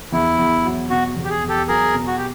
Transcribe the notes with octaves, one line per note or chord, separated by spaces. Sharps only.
E2 E4
E2
F#3
B2 F#4
E2
G4
G#4
E2
G4 A4
F#3 G#4 A#4
B2
F#4
G4